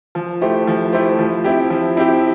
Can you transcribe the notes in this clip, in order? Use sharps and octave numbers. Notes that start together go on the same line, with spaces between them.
F3
A3 E4 G4 C5
F3
A3 E4 G4 C5
F3
C4 E4 G4
F3
C4 E4 G4